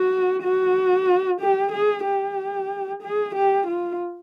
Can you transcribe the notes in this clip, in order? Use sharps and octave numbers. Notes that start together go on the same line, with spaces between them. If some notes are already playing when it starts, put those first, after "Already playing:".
Already playing: F#4
F#4
G4
G#4
G4
G#4
G4
F4